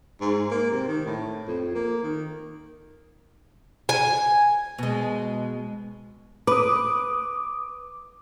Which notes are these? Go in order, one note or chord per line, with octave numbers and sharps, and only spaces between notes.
G#2
A#3
C3
D#3
A2
F2
A#3
D#3
G#5
B2 G#3
B4 D6 D#6